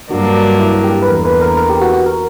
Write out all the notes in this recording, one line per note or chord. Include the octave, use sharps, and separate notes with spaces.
G2 D3 F#3 A#3 D4 F#4
E4
G4
B4
E2 D3 A#3 A#4
B4
A#4
A#4
G4
F#4
F#4
A#4